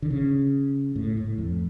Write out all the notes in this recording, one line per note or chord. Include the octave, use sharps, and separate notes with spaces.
D3
C#3
A2
A2
F2